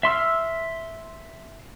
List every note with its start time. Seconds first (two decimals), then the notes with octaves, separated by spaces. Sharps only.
0.03 E5 C6 E6 F6